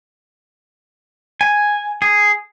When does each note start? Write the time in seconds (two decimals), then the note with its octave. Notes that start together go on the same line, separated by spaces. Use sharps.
1.41 G#5
2.02 G#4